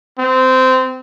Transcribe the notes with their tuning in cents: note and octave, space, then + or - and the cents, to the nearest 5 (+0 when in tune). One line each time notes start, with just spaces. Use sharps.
C4 -20